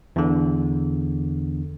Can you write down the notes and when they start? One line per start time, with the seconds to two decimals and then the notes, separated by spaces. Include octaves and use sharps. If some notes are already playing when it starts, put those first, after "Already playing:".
0.16 E2 D3